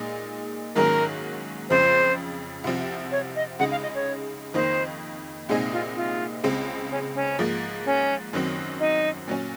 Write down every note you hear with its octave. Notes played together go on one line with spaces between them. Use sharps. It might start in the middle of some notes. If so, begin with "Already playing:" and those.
Already playing: A#2 G#3 D#4
G#2 D#3 F#3 A#3 C#4 A#4
F2 C#3 F3 C5
C2 C3 F3 C4
C#5
D#5
C#2 C#3 G#3 D#4 F#5
F5
D#5
C#5
F2 D#3 A#3 D#4 C5
C2 A#2 G#3 C4 D#4 G#4
F4
F4
C#2 C#3 G#3 C4
C#4
C#4
G#2 F3 A#3
C#4
F#2 D#3 F#3 C4
D#4
A#2 F#3 C#4